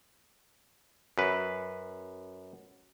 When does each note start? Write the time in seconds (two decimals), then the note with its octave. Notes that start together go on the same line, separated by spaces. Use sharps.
1.18 F#2 B4